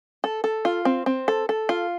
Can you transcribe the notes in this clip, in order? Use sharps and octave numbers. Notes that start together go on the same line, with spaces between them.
A4
A4
F4
C4
C4
A4
A4
F4